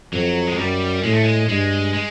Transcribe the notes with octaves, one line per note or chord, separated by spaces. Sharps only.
F2 F#3
G#3
F#2 G3
A2 G#3
A3
G#3
G2 G#3
G#3